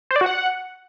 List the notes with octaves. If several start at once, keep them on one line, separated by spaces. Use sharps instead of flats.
C5
D5
F#4
F#5